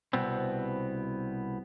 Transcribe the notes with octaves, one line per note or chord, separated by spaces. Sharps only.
C2 B2 B3 C4